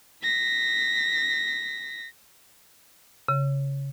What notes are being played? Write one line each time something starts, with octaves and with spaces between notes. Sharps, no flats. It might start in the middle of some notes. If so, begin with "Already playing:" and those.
A#6 B6
C#3